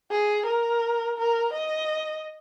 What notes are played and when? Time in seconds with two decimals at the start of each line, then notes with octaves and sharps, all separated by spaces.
0.11 G#4
0.46 A#4
1.18 A#4
1.53 D#5